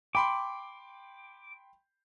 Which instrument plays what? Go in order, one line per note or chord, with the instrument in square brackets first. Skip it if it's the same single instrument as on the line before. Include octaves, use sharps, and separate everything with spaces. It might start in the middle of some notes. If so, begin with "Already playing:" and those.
[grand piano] G5 B5 C6 [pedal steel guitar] D6